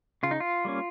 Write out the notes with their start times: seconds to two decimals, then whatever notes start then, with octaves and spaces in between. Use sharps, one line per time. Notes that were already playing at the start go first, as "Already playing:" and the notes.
0.23 C#3 F4
0.31 D#4
0.40 F4
0.65 G3 A#3 C#4